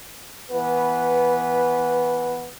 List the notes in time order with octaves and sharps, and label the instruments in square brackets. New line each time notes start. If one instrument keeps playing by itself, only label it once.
[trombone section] E3 B3 B4